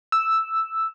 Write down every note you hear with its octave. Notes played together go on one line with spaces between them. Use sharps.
E6